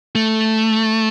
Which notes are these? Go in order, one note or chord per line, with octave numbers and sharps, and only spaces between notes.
A3